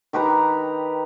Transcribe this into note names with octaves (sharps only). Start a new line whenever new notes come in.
D#3 G4 B4 A#5